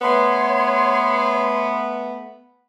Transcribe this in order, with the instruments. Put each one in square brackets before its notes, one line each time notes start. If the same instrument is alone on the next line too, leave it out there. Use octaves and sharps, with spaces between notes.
[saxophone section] A3 B3 [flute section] C#5 C6